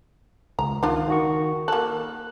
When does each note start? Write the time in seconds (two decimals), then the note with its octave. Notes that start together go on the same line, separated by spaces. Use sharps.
0.59 C#2 A#5
0.83 D#3 D4 F4
1.08 D#3 F#4 C#6
1.68 A#3 A4 F#6